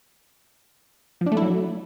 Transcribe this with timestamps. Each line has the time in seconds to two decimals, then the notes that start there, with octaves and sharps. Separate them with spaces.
1.21 F3
1.26 D4
1.32 A3
1.37 E4
1.42 F#3